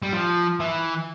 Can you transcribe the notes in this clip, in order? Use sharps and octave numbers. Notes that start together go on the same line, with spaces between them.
G3
F3
E3